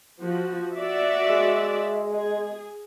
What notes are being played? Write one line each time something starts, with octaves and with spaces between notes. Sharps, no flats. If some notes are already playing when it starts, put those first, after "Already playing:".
F3 F#4
F#4 D5 E5
G#3
G#4